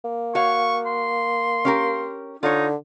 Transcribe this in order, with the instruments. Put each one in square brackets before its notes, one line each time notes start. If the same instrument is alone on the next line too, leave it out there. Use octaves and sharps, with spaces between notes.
[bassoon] A#3
[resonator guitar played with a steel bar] F#4 C#5 F5 [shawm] C#6
[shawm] C6
[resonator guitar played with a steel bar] C#4 G4 A#4
[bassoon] D3 [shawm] D#4 [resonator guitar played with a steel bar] F4 C#5